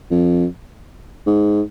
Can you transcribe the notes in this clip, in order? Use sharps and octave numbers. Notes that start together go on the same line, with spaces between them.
F2
G#2